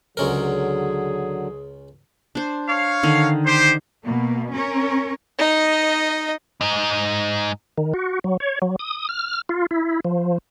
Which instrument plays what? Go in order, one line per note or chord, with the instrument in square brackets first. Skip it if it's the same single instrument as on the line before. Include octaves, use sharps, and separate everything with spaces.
[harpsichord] C#2 C#4 A#4 [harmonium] D3 F#3 [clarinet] G#4
[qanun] D4 C5
[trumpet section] C#5 F5
[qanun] D3 D#3
[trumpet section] G4 C5
[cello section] B2 A#3
C#4 A#4 C#5
[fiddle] D#4 D#5
[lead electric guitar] G#2 D#4
[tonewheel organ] D#3
F#4
F#3
C#5
F#3
D#6
F6
F4
E4
F3